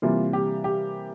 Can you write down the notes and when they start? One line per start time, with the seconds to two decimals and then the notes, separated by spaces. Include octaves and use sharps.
0.02 C3 E3 G3 A#3 F4
0.33 G4
0.64 G4